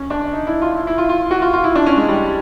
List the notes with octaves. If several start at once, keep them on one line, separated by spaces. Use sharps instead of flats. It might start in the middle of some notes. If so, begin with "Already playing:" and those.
Already playing: C#4
D4
D#4
E4
F4
E4
E4
F4
F4
F#4
F4
F4
E4
D4
C#4
G#3
G3